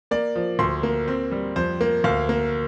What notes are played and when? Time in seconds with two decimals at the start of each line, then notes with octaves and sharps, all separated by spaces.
0.11 A#3 D5
0.35 F3
0.59 D2 C6
0.83 A#3
1.08 C4
1.32 G3
1.56 F2 C5
1.81 A#3
2.04 D2 F5
2.29 A#3